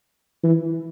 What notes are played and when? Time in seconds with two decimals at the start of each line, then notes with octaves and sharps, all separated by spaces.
0.43 E3